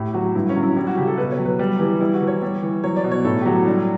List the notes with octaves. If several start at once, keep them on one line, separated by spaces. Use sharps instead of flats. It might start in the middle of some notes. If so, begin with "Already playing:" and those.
Already playing: A2 G4
F#3 F#4
G2 E4
C#4
F#3
E4
G3 E4
F#4
C#3 G4
A4
B2 B4
C#5
F#3
B4
G3
E3 G4
G3 E4
F#4
E3
C#5
G3
E3
F#3 C#5
D5
B2
C#5
A2 A4
G4
F#3 F#4
E4
G3 D4